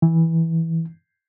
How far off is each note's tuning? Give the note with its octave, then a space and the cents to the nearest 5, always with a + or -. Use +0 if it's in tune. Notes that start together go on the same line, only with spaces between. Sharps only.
E3 -10